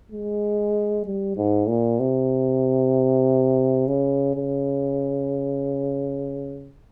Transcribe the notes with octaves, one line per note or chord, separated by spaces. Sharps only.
G#3
G3
G#2
A#2
C3
C#3
C#3